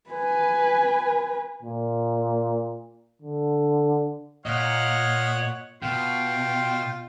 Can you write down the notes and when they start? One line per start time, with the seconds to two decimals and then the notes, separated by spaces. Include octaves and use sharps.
0.10 B4 G#5
1.62 A#2
3.22 D3
4.46 A#2 C#5 D#5 F5 F#5
5.83 B2 F4 G5 C6